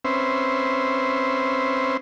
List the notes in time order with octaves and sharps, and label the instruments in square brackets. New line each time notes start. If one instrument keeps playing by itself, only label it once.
[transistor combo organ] C4 C#4 B4 C5 E5